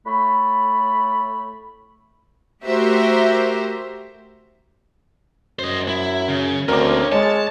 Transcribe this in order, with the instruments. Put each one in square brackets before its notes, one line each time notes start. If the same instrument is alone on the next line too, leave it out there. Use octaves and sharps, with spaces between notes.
[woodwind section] A2 A3 B5
[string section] A3 F#4 G4 A#4 C5 E5
[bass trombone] F#2 [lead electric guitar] C5 D#5
[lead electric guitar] E4
C#3
[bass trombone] D2 [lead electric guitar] C4 C#4 [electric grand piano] A#4 D6
[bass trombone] G#3 [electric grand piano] C#5 [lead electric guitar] A5